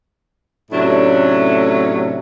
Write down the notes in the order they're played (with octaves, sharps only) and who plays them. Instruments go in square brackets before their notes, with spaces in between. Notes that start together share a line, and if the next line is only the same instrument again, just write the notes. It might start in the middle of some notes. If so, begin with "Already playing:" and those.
[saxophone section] A2 C3 F#3 A3 C#4 D4